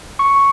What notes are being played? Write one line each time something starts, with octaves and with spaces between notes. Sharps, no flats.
C#6